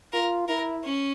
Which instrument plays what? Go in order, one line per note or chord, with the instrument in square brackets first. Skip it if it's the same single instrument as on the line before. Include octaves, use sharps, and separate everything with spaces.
[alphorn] F4 [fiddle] A#4
[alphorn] E4 [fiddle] A#4
[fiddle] C#4